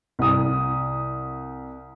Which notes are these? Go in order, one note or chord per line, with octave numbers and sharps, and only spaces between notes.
C2 D#6